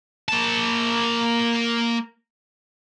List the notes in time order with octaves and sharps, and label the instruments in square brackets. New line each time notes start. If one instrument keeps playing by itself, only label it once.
[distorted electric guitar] A#3 A5